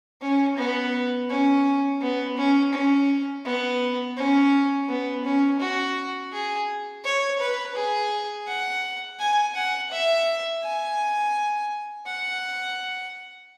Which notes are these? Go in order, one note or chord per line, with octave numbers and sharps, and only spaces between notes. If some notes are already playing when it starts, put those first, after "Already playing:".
C#4
B3
C#4
B3
C#4
C#4
B3
C#4
B3
C#4
F#4
G#4
C#5
B4
G#4
F#5
G#5
F#5
E5
G#5
F#5